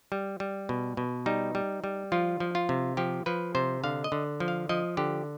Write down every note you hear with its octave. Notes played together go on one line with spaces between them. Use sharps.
G3
G3
B2
B2
G3 D#4
G3
G3
F3 F4
F3
F4
C3
F3 G4
F3 B4
C3 C5
D3 F5
D#5
D3
F3
F5
F3 D#5
D3 G4